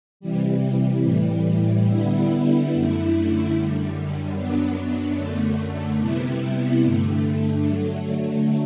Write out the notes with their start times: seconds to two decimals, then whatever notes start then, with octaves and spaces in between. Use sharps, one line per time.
0.20 C3 E3 G3
1.03 A2 E3 G3
1.86 D3 G3 B3 E4
2.69 F#2 D3 A3 E4
3.52 F#2 D3 G3
4.35 F#2 F#3 B3 D4
5.17 F#2 D3 A3
6.00 C3 G3 B3 E4
6.83 G2 D3 A3
7.66 D3 F#3 A3